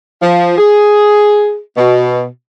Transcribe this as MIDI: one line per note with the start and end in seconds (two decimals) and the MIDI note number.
0.22 0.57 53
0.58 1.58 68
1.77 2.26 47